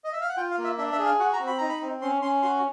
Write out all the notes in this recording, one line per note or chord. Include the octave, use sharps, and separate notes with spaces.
D#5
E5
F5
F#5
F4 G5
F5
A#3
E5
D4 E5
E5
G#4
F5
F#4 F#5
A#5
C4
B5
D#4 A#5
B5
C4
C#4 C6
C#4 C6
F#4 C6